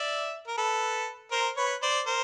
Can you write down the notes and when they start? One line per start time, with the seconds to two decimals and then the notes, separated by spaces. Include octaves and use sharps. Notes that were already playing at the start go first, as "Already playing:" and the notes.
Already playing: D5 E5
0.47 A#4
0.57 A4 B4
1.31 A#4 C5
1.57 B4 C#5
1.83 C5 D5
2.06 A#4 C5